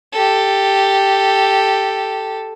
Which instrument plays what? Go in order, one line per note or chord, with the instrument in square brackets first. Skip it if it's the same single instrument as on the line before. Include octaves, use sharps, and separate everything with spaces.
[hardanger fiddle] G4 A4